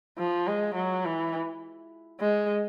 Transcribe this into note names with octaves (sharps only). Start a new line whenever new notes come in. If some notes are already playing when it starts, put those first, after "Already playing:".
F3
G#3
F#3
E3
G#3